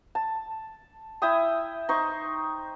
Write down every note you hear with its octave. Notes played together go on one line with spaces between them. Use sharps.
A5
E4 E5 G5 D#6
D#4 C5 C#6